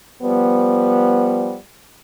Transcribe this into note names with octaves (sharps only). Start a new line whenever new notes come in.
F3 G3 B3